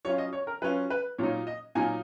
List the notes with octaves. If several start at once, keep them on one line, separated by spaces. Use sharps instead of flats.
F#3 C#4 F4 C#5
D#5
C#5
A#4
F#3 C#4 F4 B4
B4
A#2 F#3 A#3 D#4 C#5
D#5
A#2 F#3 A#3 D#4 G#5